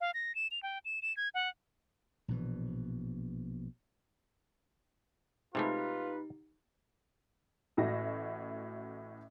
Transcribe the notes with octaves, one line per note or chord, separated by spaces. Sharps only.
F5
A#6
E7
F7
G5
E7
E7
G#6
F#5
A#1 B2 E3
C3 G#3 A3 D#4 F4 G4 B4
A1 A2 F#4 A#6